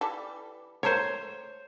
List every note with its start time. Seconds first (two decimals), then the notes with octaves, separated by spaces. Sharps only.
0.01 E3 G3 A4
0.83 A3 A#4 C5 C#5